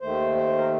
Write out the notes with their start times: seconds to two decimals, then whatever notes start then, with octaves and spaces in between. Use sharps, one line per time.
0.01 D#2 D#3 A3 C5
0.35 C5
0.58 A#4